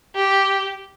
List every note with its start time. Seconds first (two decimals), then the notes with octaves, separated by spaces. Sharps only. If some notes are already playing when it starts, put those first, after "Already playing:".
0.16 G4